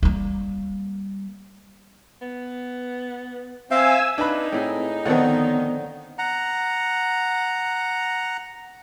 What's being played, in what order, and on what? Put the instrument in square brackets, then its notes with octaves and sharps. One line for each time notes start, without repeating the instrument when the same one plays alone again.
[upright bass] G3 A#3
[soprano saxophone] B3
[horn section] C4 [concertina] E5 F5 [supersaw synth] G#5 E6
[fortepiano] D4 B5 [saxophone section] D#4 [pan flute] B4
[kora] A2 E4 G#4 [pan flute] C4
[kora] D3 F3 C#5 [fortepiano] D#3 C4 F#5 [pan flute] B3
[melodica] F#5 A#5